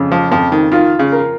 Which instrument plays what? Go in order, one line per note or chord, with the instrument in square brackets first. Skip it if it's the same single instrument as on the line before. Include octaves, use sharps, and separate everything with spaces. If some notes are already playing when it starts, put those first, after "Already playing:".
Already playing: [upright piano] F2 C#3
[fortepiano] F3
[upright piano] F2 [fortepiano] F3
[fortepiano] D#3
[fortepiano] D#3 [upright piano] F4
[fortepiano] C#3
[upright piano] A#4